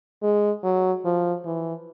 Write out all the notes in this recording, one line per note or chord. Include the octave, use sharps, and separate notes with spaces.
G#3
F#3
F3
E3